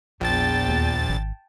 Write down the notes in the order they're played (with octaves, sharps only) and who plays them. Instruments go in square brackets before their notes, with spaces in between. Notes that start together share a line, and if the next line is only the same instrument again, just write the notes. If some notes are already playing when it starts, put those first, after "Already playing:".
[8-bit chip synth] A#1 A6 [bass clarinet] E2 [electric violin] G5 A5
[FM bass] D#2
G#1